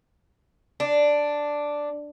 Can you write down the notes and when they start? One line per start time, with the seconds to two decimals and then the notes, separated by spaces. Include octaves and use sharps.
0.80 D4